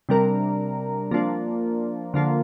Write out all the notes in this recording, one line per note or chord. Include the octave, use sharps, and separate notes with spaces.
C3 G3 D4 A#4
F3 A#3 D4 F4
D3 F3 A#3 F4